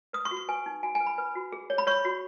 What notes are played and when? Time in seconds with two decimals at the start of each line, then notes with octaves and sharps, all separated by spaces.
0.13 B4 D#6
0.25 C#6
0.31 F#4
0.37 C#6
0.48 B4 G#5
0.66 D#4
0.83 F#4 G#5
0.95 G#5
1.00 B4
1.06 B5
1.18 B4
1.35 F#4
1.52 G#4
1.70 C#5
1.78 B5
1.87 C#5 C#6
2.05 F#4